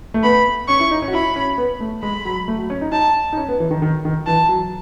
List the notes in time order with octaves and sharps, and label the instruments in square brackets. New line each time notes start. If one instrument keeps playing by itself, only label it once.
[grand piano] A3
[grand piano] B3 [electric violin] B5
[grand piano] C#4 [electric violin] C#6
[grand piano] E4
D#4
C#4
F#4
[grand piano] E4 [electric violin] B5
[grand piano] C#4
B3
A3
[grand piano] G#3 [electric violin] B5
[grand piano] F#3
A3
F#3
C#4
D#4
[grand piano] D#4 [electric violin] A5
[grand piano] D#4
C#4
B3
E3
D#3
D#3
D#3
[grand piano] E3 [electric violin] A5
[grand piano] F#3